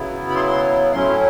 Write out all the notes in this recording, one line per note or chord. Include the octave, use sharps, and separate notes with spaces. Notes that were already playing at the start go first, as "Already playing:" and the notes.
Already playing: C#3 F#3 B3 E4
B5
C6
C6
A2 F#3 A3 C#4 E4 C6